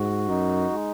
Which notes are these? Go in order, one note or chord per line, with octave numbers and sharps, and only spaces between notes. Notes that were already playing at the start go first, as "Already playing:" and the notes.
Already playing: G#2 F#4
F#2 D#4
G#3